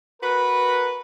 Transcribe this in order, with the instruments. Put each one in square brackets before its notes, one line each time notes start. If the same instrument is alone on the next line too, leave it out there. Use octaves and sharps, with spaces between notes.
[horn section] F#4 A#4 B4